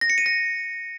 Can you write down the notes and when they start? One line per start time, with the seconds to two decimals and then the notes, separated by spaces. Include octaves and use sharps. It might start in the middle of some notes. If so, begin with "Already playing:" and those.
0.01 A#6
0.10 C#7
0.18 D#7
0.26 A#6